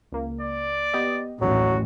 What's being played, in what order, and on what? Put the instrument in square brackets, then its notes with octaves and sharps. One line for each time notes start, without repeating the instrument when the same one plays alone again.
[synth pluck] C#2 A#3
[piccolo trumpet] D5
[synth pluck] B3 G4 D#5
[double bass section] A1 [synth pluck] D#2 [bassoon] F#3 [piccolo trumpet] F#4